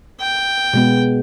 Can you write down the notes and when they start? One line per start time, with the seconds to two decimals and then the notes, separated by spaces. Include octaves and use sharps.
0.20 G5
0.73 B2 G#3 B3